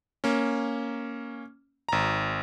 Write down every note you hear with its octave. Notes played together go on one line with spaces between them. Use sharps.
A#3 C#4
G#1 A#5